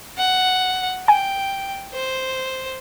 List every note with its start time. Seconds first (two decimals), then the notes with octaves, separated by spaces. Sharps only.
0.18 F#5
1.08 G5 G#5
1.94 C5